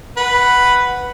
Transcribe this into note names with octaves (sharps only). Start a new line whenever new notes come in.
B4 F#5